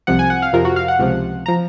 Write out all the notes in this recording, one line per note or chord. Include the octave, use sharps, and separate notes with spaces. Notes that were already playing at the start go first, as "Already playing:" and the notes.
C2 C3 F3 F#5
G#5
F#5
F5
F2 C3 F3 A#4
F#4
F5
F#5
C#2 C3 F3
A#5
F3